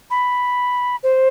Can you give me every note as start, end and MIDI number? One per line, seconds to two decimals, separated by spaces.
0.10 0.96 83
1.03 1.28 72